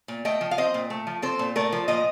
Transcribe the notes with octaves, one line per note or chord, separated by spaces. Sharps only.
A#2
A3 D#5 G5
F3
F5
C4 C5 D#5
A#2
A3
F3
C4 A4 C5
A#2
A3 A#4 D5
F3
A#2 C5 D#5